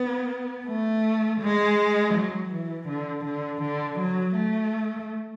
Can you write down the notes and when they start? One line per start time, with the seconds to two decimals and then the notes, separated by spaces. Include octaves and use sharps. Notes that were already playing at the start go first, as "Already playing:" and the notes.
Already playing: B3
0.67 A3
1.41 G#3
2.14 F#3
2.51 E3
2.88 D3
3.25 D3
3.62 D3
3.99 F#3
4.36 A3